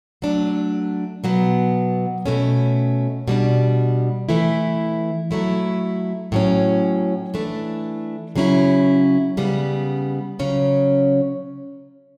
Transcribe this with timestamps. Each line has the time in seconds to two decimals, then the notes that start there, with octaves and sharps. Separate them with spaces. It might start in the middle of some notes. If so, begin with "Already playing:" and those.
0.22 F#3 A3 D4
1.24 B2 F#3 B3
2.26 B2 A3 C#4
3.28 B2 G3 D4
4.29 E3 A3 E4
5.31 F#3 A3 E4
6.32 A2 F#3 C#4
7.34 E3 A3 D4
8.36 C#3 F#3 C#4 E4
9.37 C#3 G3 B3
10.39 C#3 F#3 C#4